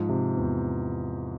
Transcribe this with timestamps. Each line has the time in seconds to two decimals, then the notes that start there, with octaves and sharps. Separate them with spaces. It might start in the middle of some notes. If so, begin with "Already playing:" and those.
Already playing: G#2 F3
0.09 C3
0.37 E2